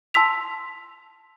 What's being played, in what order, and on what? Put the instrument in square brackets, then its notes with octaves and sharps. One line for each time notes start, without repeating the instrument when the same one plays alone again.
[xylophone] A5 C6 E6 B6 F7